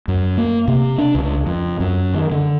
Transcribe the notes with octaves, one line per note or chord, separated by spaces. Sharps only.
F#2
A#3
C3
D4
C#2
F2
F#2
D#3
D3